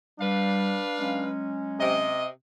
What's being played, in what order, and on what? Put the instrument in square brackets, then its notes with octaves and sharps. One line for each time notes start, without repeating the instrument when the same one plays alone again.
[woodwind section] G3 [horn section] D4 B4 F5
[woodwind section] F#3 G#3 C#4
[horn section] C3 D#5